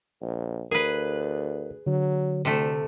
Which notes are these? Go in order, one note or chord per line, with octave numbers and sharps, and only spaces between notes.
A#1
D2 G#4 A#4 B4
D3 F#3
D2 C3 A3